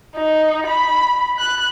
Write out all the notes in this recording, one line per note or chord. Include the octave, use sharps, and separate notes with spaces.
D#4
B5
F#6